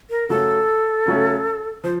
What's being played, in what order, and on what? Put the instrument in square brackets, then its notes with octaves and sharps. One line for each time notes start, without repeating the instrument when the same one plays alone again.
[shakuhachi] A#4
[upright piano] C#3 F#3 A3 C#4 [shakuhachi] A4
[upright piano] C#3 F#3 A3 C#4
[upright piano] F3 [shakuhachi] C5